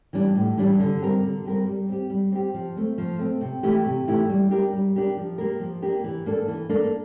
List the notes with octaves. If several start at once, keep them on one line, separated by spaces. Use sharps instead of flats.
E3 G3 D4
A2
E3 G3 D4
D3
G3 C4 G4 A#4
D3
G3 C4 G4 A#4
G3
C4 G4
G3
C4 G4
F3
A3 C4
F3
A3 C4
C3
E3 A3 E4 G4
C3
E3 A3 E4 G4
G3
D4 G4 A#4
G3
D4 G4 A#4
F3
A#3 D4 G4 A#4
F3
A#3 D4 G4 A#4
E3
A#3 D4 A4
E3
A#3 D4 A4